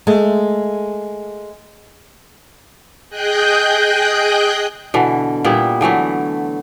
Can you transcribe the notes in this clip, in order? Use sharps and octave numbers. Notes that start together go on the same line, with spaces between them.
G#3 A3
G#4 D#5 G5 F#6 G6
B2 D3 E3
A#2 G3 B3 E4
D3 E3 F#3 A3